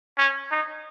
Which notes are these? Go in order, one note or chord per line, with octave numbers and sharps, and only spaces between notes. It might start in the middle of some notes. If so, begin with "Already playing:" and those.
C#4
D#4